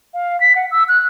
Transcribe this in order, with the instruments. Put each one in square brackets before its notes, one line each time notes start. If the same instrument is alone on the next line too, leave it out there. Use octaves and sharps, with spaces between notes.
[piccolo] F5
B6
F#5
E6
F#6